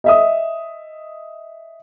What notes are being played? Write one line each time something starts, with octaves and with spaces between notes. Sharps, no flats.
D#5 E5 D#6